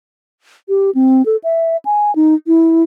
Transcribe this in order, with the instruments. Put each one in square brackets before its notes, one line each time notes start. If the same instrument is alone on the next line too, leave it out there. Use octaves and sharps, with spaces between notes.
[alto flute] G4
C4
A4
E5
G#5
D#4
E4